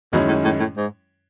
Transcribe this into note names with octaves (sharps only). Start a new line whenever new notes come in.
F#2 B2 D#3 G#3 C#4 E4
A2
A2
A2
G#2